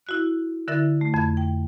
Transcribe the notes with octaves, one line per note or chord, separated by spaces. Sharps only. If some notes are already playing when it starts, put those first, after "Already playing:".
E4 F#4 F#6
D3 E4 A#4 E5 A6
A3
F2 G#6
G5